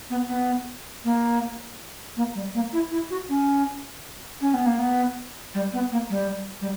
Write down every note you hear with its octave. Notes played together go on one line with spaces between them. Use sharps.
B3
B3
A#3
A#3
G3
A#3
E4
E4
F#4
C#4
C#4
B3
A#3
B3
G3
B3
A#3
G3
G3